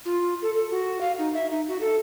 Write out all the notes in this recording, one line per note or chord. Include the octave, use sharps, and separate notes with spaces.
F4
A4
A4
F#4
F5
D#4
E5
D#4
F#4
A4